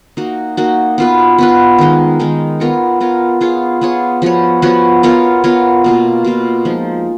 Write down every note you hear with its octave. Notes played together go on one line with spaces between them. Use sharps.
A#3 D#4 F#4
A#3 D#4 F#4
B3 F4 B4
B3 F4 B4
D#3 G#3 D#4
D#3 G#3 D#4
B3 F4 A#4 C#5
B3 F4 A#4 C#5
B3 F4 G#4 C#5
B3 F4 G#4 C#5
F3 B3 F#4 C#5
F3 B3 F#4 C#5
B3 F4 A#4 C#5
B3 F4 A#4 C#5
B2 A#3 F4
B2 A#3 F4
F3 G#3 D#4